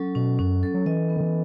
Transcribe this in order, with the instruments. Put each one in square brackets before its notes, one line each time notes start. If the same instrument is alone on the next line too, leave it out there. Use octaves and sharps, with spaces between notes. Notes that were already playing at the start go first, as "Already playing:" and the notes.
Already playing: [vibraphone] F#3 C#4 A4
[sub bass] B2 [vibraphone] C#4
[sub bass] F#2 [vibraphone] C#4
[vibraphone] A4
[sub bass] F#3
[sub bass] E3 [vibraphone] D#5
[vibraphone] B3
[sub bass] D#3
E3